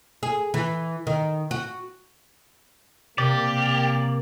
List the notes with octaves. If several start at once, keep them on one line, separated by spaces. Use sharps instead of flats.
G#4
E3
D#3
F#4
C3 A#3 G4 D5